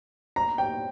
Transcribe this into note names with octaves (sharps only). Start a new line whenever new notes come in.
A#5
G5